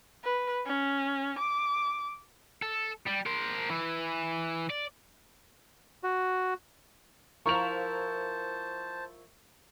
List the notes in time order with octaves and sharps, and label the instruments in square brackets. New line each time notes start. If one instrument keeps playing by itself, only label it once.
[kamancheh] B4
C#4
D6
[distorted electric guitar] A4
G3
A#4 C5
E3
D5
[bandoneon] F#4
[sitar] F3 E4 A#4 [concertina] C5 A5 [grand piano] C#6 F7